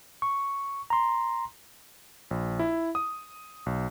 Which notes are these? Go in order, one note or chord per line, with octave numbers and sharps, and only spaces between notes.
C#6
A#5 C6
A#1
E4
D#6
B1